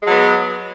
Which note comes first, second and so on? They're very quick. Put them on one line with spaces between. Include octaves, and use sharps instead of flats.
G#3 F#3 B3